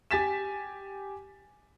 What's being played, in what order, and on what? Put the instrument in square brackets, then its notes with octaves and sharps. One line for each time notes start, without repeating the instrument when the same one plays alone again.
[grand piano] G4 G#5 A6 B6 E7